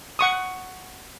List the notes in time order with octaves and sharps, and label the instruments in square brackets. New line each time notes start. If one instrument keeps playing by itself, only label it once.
[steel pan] F#5 C#6 D#6